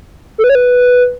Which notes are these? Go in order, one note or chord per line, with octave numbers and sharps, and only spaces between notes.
A4
B4
C#5
B4